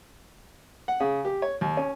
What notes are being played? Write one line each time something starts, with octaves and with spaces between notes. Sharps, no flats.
F#5
C#3
G4
C#5
D#2
C#4